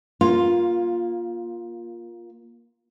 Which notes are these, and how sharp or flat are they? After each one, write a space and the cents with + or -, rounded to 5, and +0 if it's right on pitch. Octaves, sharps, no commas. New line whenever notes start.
A#3 +20 F4 +0